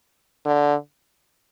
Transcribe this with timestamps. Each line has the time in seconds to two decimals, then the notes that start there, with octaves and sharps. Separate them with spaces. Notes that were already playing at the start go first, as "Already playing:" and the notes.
0.46 D3